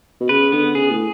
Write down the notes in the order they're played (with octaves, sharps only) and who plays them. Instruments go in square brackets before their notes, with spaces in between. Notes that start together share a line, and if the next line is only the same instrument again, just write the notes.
[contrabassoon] B2
[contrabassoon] C#3 [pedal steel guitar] B4
[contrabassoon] D3 [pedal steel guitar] B3
[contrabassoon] C#3 [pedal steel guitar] G#4
[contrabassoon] A2